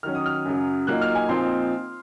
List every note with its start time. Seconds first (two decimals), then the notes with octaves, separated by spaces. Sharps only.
0.03 D#3 F#3 C#4 F6
0.15 D#6
0.26 F6
0.45 F#2 C#3 F#3
0.87 A#2 F#3 A#3 D#4 F#6
1.01 F6
1.15 G#5
1.29 A#2 F3 C4 D#4 C6